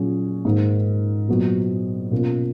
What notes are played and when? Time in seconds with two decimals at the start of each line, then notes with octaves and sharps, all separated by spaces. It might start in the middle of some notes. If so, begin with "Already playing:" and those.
Already playing: A#2 F#3 C#4 F4 G#4
0.45 G#2 D#3 A#3
1.28 A#2 F#3 B3 F#4
2.11 B2 A#3 C#4 F4